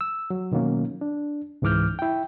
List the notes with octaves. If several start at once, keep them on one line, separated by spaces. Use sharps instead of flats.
E6
F#3
B2 D#3 F#3 A#3 C#4
D4
C#2 G#2 E3 D6 F6 G6
E4 G5